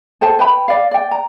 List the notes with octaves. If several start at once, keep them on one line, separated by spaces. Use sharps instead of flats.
A4 C5 G5 A5
B4 G5 B5
D5 F5
D5 G5
A#5